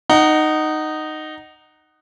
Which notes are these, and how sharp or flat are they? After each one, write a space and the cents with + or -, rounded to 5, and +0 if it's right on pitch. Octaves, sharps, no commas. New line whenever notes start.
D#4 -10 F#5 +15